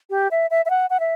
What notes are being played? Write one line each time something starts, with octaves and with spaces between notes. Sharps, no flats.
G4
E5
E5
E5
F#5
F#5
E5